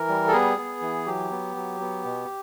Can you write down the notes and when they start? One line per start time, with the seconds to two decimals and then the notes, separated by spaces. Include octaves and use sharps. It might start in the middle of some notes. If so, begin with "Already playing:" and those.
Already playing: E3 A#4
0.08 G3
0.28 A4
0.33 B3 G#4
0.58 B3
0.82 E3
1.06 F#3 G4
1.31 B3
1.56 F#3
1.80 B3
2.05 B2